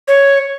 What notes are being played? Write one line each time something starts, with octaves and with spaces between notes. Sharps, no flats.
C#5